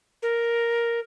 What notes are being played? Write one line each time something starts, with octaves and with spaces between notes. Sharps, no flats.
A#4